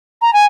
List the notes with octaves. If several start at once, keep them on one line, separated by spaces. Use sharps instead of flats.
A#5
G#5